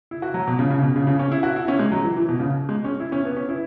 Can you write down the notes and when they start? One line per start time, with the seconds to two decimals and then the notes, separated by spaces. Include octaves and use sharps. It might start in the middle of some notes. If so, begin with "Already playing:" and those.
0.11 E4
0.22 F#4
0.34 F#3
0.47 B2
0.59 C#3
0.71 C#3
0.82 B2
0.96 C#3
1.07 C#3
1.19 C#4
1.32 E4
1.43 F#4
1.56 E4
1.68 C#4
1.79 G#3
1.92 F#3
2.04 E3
2.16 E3
2.29 B2
2.40 C#3
2.69 G#3
2.84 C#4
3.00 E4
3.12 C#4
3.25 B3
3.37 C#4
3.49 E4